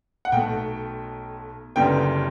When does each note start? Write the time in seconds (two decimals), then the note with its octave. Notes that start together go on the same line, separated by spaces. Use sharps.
0.25 F#5
0.32 B1 B2 A3 G5
1.76 F#1 F#2 D3 G3 B3 G5